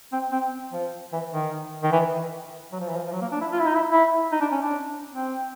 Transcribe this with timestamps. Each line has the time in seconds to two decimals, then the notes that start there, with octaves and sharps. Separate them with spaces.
0.12 C4
0.32 C4
0.72 F3
1.12 E3
1.31 D#3
1.83 D#3
1.92 E3
2.72 F#3
2.80 F3
2.89 E3
2.96 F3
3.07 F3
3.12 F#3
3.21 A#3
3.32 D4
3.41 E4
3.52 F4
3.60 E4
3.66 D#4
3.74 E4
3.91 E4
4.32 D#4
4.41 D4
4.52 C#4
4.61 D4
5.11 C4